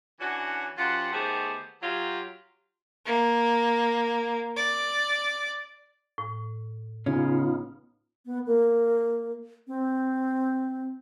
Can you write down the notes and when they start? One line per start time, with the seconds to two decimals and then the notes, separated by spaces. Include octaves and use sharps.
0.20 E3 C#4 D4 F#4
0.78 F#2 F4 G4 C5 F#5
1.12 D#3 A3 B3 G4 G#4 C5
1.82 F#3 F4 G4
3.06 A#3
4.56 D5
6.18 A2
7.06 C#3 B3 C#4 D#4 F4
8.26 B3
8.46 A#3
9.68 C4